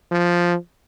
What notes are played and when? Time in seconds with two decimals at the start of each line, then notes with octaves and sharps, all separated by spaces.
0.12 F3